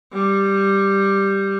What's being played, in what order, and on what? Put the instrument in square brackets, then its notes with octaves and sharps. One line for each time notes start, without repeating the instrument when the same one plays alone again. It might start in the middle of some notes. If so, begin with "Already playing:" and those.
[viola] G3